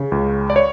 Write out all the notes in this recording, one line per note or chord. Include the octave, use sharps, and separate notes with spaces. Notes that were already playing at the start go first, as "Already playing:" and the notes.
Already playing: C#3
C#2
D5
C#5